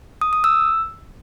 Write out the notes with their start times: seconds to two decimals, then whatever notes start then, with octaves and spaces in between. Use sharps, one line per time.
0.21 D#6
0.33 D#6
0.44 E6